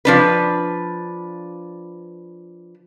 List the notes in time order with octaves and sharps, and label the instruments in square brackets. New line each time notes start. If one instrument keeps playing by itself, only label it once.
[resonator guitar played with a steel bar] F3 D4 B4